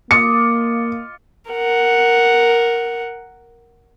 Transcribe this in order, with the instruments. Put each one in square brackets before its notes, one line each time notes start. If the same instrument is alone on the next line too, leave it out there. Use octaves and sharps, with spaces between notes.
[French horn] A#3 [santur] F4 D#5 D6 [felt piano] C#7
[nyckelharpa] A#4 F#5